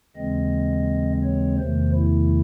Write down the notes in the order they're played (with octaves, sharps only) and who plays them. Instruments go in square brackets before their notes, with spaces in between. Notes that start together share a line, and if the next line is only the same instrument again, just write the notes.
[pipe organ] D#2 C#3 E3 G#3 C4 D#5
C#5
E2 C3 D#3 A3 C5
E4